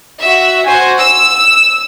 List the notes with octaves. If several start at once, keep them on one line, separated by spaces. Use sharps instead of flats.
F#4 E5
F#4 C5 G#5
E6